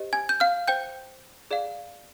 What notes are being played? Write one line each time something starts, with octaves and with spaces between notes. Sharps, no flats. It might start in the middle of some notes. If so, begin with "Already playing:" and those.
Already playing: G4 C5 D#5
G#5 G#6
G6
F5 F6
C5 G5 G6
G#4 D5 F5